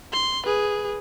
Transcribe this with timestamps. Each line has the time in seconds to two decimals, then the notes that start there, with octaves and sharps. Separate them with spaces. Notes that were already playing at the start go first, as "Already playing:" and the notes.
0.12 C6
0.46 G#4 B4